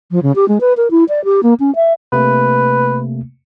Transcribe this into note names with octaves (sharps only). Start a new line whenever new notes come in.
F3
C#3
G4
G#3
B4
A#4
E4
D5
G4
A#3
C#4
E5
C3 A3 A#3 B4